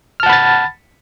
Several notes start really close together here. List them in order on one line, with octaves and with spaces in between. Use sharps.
F6 A5 F#5 B5 A6